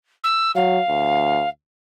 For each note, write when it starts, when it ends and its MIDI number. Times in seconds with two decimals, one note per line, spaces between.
0.24 0.51 88
0.55 0.79 54
0.55 1.49 77
0.89 1.45 38